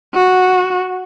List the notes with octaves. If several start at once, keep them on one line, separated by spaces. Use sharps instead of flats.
F#4